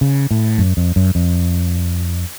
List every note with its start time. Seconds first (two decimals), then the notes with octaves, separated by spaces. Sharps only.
0.01 C#3
0.31 A2
0.58 F#2
0.77 F2
0.96 F#2
1.15 F2